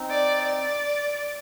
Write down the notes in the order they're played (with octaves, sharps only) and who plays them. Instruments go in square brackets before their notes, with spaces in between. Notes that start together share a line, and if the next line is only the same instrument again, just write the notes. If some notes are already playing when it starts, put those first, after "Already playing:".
Already playing: [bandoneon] C4 D#4
[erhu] D5
D5